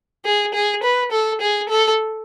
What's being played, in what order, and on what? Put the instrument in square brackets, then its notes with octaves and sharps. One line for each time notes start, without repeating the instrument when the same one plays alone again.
[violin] G#4
G#4
B4
A4
G#4
A4